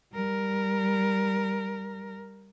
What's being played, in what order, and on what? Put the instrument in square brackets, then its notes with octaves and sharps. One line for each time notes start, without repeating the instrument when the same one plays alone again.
[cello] G3 A#4